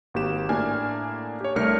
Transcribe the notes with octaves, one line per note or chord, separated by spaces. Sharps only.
G#1 A#3 F#4 G4 E7
A2 A#3 D4 G#5 F6
G4 C#5
C2 A3 D4 A#4 F6 C#7